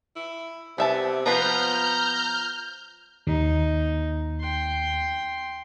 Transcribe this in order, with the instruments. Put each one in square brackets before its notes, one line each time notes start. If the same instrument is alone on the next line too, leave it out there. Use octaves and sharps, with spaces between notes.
[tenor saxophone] E4
[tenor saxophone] C3 [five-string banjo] B3 E5 A5
[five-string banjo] F3 F4 B4 [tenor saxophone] B3 [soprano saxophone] A#5 [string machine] F6 G6
[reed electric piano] D#2 [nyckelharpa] D#4
[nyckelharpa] G5 C6